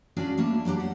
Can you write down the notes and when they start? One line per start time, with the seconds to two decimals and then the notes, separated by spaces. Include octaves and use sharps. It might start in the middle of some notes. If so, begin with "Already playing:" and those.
0.17 C#4 D4 F4 F#4 G#4 D5
0.38 G3 A3 A#3 A5
0.65 F#3 G3 D4 G4
0.80 F#5